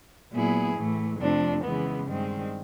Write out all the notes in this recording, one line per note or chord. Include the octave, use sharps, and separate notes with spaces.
A#2 F#3 B3 E4 G#4
A2 E3 A3
F2 C3 F3 A3 D4
C#3 E3 G#3 B3
G2 D#3 G#3 C4